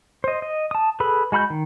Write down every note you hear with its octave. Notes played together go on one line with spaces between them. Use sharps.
C5 D#5
D#5
A5 D#6
G#4 A4 B4 B5
G#3 F#4 B5 F6 G6
D#3